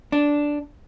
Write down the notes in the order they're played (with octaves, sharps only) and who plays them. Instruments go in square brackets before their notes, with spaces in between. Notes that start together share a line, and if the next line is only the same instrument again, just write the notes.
[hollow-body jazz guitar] D4